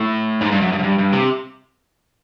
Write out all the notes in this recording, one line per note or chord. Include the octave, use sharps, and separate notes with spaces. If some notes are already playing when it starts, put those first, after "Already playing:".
Already playing: A2
G#2
G2
F#2
G2
F#2
G2
G2
C3